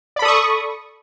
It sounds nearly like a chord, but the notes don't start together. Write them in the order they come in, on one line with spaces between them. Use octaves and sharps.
D5 B5 A4 D#6 C#6